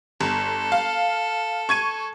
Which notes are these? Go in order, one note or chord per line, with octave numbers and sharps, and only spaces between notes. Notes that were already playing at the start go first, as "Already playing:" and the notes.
G1 A4
F5
C#6 G#6 D#7